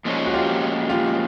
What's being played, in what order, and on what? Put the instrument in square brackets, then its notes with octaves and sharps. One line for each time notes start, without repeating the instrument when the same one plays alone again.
[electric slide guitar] A#2 F3 G#3 C#4
[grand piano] F#4
F4 G4
F4 G4